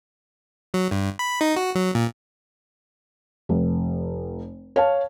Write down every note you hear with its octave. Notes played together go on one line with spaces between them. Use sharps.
F#3
G2
B5
D#4
F#4
F#3
A#2
F1
C#5 F5 A5